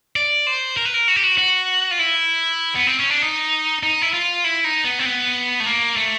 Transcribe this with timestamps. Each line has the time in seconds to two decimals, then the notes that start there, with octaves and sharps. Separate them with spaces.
0.16 D5
0.47 C5
0.77 A#4
0.85 B4
0.94 A#4
1.08 F#4
1.16 G4
1.24 F#4
1.38 F#4
1.91 F4
1.99 E4
2.75 B3
2.87 C4
2.99 C#4
3.10 D4
3.22 D#4
3.83 D#4
4.02 E4
4.13 F4
4.44 E4
4.64 D#4
4.85 B3
4.99 C4
5.05 B3
5.60 A3
5.66 A#3
5.96 A3